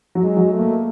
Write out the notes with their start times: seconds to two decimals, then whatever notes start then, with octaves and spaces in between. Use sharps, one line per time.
0.15 F#3
0.23 G#3
0.37 F#3
0.52 A3
0.59 A#3